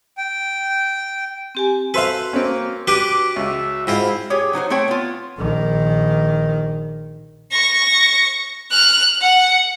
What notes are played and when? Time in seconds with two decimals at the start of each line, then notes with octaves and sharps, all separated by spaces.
0.18 G5
1.55 C4 G4 G#5
1.94 F#4 A4 B4 C5 E5 F5
2.33 A#3 C4 C#4
2.87 D4 F#4 G4 B4 D6
3.36 C#2 E5
3.87 G#2 C4 E4 F4
4.30 G4 G#4 C#5
4.53 F#3 D#4 F#4 C5
4.70 A3 C4 C#5 G5
4.88 B3 F4
5.38 A#1 D#3
7.52 C#6 A#6
8.71 F6 F#6
9.21 F#5